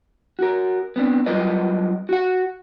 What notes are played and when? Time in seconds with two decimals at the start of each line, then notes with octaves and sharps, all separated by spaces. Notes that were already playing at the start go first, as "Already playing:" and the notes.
0.39 F#4 A#4
0.96 B3 C4 D4
1.26 F#2 G3 F4 A#4 B4 D#5
2.09 F#4 F#5